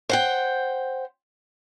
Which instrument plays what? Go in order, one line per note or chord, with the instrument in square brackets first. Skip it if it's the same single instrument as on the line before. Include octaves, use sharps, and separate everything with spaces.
[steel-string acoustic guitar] C5 F#5 G5